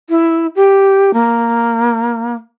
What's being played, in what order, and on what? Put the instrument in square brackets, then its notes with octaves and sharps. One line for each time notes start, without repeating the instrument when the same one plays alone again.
[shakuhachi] E4
G4
A#3